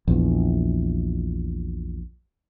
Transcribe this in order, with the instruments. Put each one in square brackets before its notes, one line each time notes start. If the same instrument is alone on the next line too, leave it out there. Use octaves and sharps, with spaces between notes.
[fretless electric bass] A#1 E2